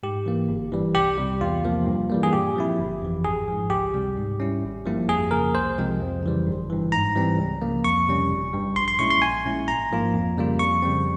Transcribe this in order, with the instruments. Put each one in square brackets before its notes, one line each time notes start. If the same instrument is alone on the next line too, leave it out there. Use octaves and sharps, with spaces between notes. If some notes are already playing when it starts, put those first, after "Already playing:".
[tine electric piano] G#2 G4
E3 A#3
G1
G2 E3 G3
C2 G4
C3 G3
E2 F4
C3 F3 A#3
G2
E3 G3 A#3
G#4
A#2 G4
F3 C4 E4
G1
F2 E3
G#1 G#4
G#2 F3
C#2 G4
C3 G3
G#2
G3 C#4 E4
G#1
G2 F3 A#3 E4
F2 G#4
C#3 F3 A#3 A#4
C2 C5
C3 F3 G#3 C4
F2
C#3 E3 G3
G1
G2 E3
G#2 A#5
E3 G3 C4
C#2
C#3 F3 A#3
F2 C#6
C3 G3 C#4
G1
G2 G3
A#1 C6
C6
A#2 G#3 C#4 E4 C#6
C6
A#1 G#5
A#2 G#3 C#4 E4
G#1 A#5
G#2 F3 A#3 F4
F2
C#3 G3 A#3 F4
F2 C#6
C#3 G3 C4